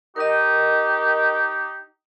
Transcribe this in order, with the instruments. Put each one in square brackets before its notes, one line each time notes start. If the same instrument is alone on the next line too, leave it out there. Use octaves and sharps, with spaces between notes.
[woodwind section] D#4 G4 [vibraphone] A#4 D#5